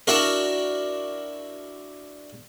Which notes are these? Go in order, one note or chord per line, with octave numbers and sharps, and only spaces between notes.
D4 E4 F#4 A#4